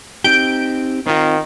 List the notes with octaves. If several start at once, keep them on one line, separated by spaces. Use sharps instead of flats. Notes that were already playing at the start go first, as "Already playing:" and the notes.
C4 D#4 G4 G6 D7
D#3 C4 F4